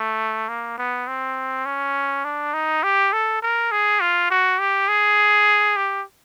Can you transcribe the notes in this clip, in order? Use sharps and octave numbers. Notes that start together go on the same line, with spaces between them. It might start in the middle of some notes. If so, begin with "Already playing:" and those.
Already playing: A3
A#3
B3
C4
C#4
D4
D#4
G4
A4
A#4
G#4
F4
F#4
G4
G#4
G4